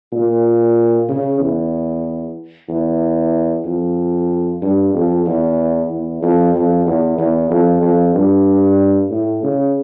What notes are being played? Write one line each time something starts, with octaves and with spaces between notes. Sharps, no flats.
A#2
C#3
E2
E2
F2
G2
F2
E2
E2
F2
F2
E2
E2
F2
F2
G2
A2
C#3